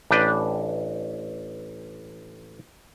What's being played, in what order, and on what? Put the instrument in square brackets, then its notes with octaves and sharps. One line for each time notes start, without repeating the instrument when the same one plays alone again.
[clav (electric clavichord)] A1 D4 B4 G5